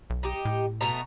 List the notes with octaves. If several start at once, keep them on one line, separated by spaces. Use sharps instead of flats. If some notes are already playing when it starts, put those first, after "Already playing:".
B1
D#4 G4
A2
B2 A3 A#5